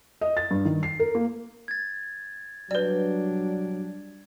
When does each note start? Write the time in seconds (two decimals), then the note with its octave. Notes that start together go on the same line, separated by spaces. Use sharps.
0.21 D#5
0.37 A6
0.51 G2
0.65 D#3
0.83 C7
1.00 A#4
1.15 A#3
1.68 G#6 A6
2.71 F#3 G3 D4 B4 D5